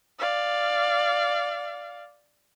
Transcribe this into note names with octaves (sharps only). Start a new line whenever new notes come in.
D5 F5